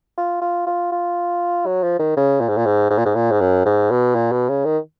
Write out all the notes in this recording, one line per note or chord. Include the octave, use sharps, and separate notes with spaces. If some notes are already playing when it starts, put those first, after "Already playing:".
F4
F4
F4
F4
F#3
F3
D#3
C#3
A#2
G#2
A#2
G#2
G#2
A#2
G#2
A#2
G#2
F#2
G#2
B2
A#2
B2
C#3
D#3